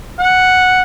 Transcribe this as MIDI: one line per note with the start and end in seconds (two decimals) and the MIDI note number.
0.20 0.82 78